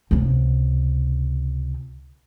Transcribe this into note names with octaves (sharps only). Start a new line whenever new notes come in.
C#2 C3